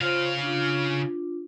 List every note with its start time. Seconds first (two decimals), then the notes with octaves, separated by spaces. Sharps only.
0.01 C#3 F4 C5 F5 C6
0.42 D4 F4